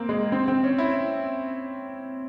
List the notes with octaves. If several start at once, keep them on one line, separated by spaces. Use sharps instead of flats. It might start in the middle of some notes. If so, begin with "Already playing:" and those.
Already playing: A#3 C4
G#3
C4
C4
C#4
E4